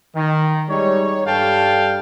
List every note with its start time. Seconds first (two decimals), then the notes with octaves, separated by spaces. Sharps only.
0.16 D#3
0.69 G3 G#3 D#4 C#5
1.26 G2 G3 A4 F5 G5 A5